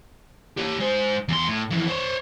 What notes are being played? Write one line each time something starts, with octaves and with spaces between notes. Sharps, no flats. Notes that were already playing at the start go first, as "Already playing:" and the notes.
G4 C#5
G#3 C5
E2 C6
A2
F2 E3
C5 C#5